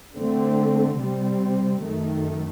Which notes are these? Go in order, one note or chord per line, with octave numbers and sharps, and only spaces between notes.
D3 A3 C4
C3 G3 C4
F#2 D#3 A3